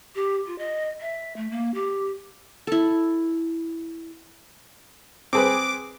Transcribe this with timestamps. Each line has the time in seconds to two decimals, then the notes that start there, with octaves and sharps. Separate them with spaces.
0.15 G4
0.47 F4
0.58 D#5
1.00 E5
1.36 A3
1.51 A#3
1.74 G4
2.67 E4 A4
5.33 C4 G#4 B4 D6